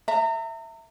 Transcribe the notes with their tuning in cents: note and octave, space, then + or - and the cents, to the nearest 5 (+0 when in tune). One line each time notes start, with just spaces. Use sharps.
E5 +0 A#5 -35